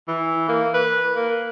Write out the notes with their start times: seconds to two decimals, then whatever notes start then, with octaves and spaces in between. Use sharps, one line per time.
0.08 E3
0.48 A#3
0.74 B4
1.16 A#3